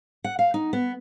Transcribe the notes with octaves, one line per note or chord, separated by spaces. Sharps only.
F#5
F5
D#4
B3